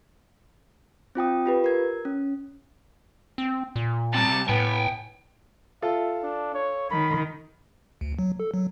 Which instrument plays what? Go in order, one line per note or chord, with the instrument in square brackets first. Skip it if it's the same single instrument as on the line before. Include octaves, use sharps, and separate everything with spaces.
[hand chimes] C4 F4 G5 D#6
F4 G4 B4
A#4 G#6
C#4
[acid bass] C4
A#2
[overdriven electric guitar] C3 G3 [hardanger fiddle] A5
[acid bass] A2 [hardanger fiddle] B3 [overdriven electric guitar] G5 G#5
[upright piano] F4 A4 [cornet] E5
[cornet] D4
C#5
[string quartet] D#3 [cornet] B5
[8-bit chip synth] D2
F#3
A4
F#3